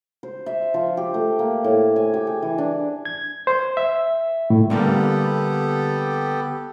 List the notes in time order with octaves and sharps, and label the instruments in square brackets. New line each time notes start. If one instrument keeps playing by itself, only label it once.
[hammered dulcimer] C5
E5
F3
G4
A3
A#3
A2
G#5
G4
G#4
E3
D4
[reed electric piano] G#6
C5
E5
A2
[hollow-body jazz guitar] D3 G3 A#3 [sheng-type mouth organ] B3 G4 A4